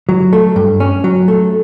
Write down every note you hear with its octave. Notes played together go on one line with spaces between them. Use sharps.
F#3
A3
G2
C#4
F#3
A3